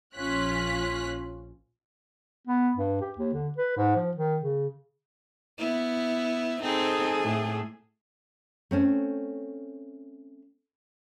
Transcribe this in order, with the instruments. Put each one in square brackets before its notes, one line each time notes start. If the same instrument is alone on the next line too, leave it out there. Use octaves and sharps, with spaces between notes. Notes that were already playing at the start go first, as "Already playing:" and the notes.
[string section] A#1 F3 C#4 F4 F#6 B6
[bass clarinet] B3
G2
G4
D#2
D3
B4
G#2
F3
D#3
C#3
[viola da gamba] B3 E4
[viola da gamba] C4 D#4 [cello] G#4 A4
[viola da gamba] A2 A3
[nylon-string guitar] A3 C4 C#4